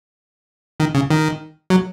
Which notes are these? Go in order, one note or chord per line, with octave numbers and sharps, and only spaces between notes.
D#3
C#3
D#3
F#3